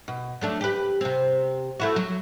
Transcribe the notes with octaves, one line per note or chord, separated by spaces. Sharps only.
B2
F#3 A3 D4
G4 B4
C3 C4
A3 E4 F#4
F#3